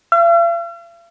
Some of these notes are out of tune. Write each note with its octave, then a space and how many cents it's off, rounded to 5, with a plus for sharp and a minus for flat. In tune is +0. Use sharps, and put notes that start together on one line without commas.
F5 -45